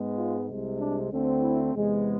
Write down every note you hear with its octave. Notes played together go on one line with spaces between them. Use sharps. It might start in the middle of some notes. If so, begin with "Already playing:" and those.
Already playing: G#2 G#3 B3
F4
C2 C3 G#3
D4
D2 D3 A3 C4
E4
E2 C3 G#3 B3